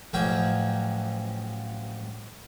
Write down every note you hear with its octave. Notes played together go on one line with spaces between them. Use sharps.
A1 F3 F#3 F5 G5 G#5